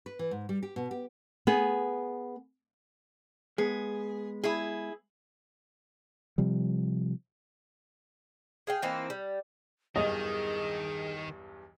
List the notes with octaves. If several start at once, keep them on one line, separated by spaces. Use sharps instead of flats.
B4
E3
G#2
G3
G4
B2
G4
B3 G#4
G#3 B3 G#4
E4 G#4
C3 F3 G3
G#4 F5 G5
E3 A#3 C4 D#4
G3
B1 E2 G2 D#3 G#4 D#5